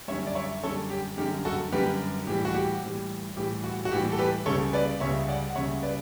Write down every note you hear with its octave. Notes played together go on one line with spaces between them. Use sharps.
F#2 D3 G3 C#5 E5
D5
C#5 E5
F#2 D3 G3 A4 C#5
G4
F#2 D3 G3 G4
F#4 A4
F#2 D3 G3 G4 B4
A2 E3 G3 G4
F#4
G4
A2 E3 G3
A2 E3 G3 G4
F#4
F#4
A2 E3 G3 G4
A4
G4 B4
C#2 C#3 G3 A4 C#5
B4 D5
C#2 C#3 G3 C#5 E5
D5 F#5
F#5
C#2 C#3 G3 C#5 E5
B4 D5